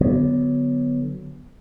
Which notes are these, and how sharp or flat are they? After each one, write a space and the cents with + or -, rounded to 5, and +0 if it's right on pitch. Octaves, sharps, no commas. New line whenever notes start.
D3 +0 F#3 +0 B3 +0